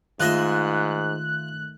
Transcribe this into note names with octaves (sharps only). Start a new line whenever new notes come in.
G#2 D#3 A3 F4 D#5 E5 F#6